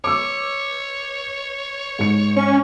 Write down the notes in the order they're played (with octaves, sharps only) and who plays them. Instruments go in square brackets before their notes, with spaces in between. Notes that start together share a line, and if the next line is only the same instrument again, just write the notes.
[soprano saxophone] C#5 [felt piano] D6 E6
[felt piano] G#2 C#7
[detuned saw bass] C#4 [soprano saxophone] C#6